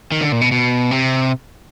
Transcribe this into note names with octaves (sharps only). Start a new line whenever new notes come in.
D#3
D3
A#2
B2
B2
C3